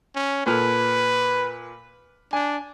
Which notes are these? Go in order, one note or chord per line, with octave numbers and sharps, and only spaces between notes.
C#4
A#2 A4 B4 F6
D4 G#5